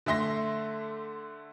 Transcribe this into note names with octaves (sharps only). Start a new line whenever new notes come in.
D3 A3 E5 C6 A#6